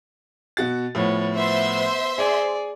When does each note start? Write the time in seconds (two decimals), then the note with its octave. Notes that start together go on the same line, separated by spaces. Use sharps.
0.57 B2 F#4 A6
0.95 A2 F3 B3 C#5
1.35 B3 C5 E5 C6
2.18 G#4 D5 G#5